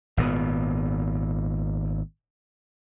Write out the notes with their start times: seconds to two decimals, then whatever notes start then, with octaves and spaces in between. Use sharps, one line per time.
0.17 G#1 A#2 D3 B3